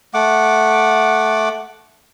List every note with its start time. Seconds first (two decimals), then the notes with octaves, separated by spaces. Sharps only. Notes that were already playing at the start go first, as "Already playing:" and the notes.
0.14 A3 F#5 D6